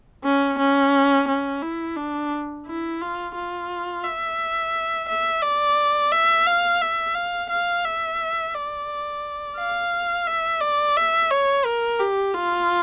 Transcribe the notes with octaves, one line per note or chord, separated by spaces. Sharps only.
C#4
C#4
C#4
E4
D4
E4
F4
F4
E5
E5
D5
E5
F5
E5
F5
F5
E5
D5
F5
E5
D5
E5
C#5
A#4
G4
F4